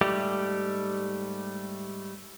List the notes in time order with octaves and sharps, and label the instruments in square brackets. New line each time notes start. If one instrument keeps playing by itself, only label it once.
[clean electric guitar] G#2 G3 A3 G4